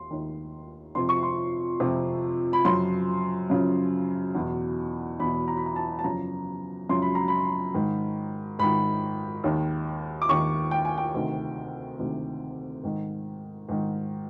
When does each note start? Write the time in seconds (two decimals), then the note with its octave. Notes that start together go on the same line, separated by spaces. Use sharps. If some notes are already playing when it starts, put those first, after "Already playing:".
Already playing: D#2 C6
0.11 D#2 D#3
0.95 F2 C3 F3 C6
1.09 C#6
1.23 C6
1.80 F2 C3 F3
2.53 B5
2.65 F#2 C#3 F3 C6
3.50 F#2 C#3 F3
4.35 E2 B2
5.19 E2 B2 B5
5.48 A#5
5.57 B5
5.66 A#5
5.76 A5
5.99 A5
6.04 F#2 C#3 F3 A#5
6.89 F#2 C#3 F3 C6
7.02 B5
7.15 A#5
7.28 B5
7.74 G#2 D#3
8.59 G#2 D#3 B5
9.44 D#2 D#3
10.22 D6
10.29 D#2 D#3 C#6
10.71 G5
10.85 G#5
10.98 G5
11.14 D2 C3 D#3
11.99 D2 C3 D#3
12.84 G#2 D#3
13.68 G#2 D#3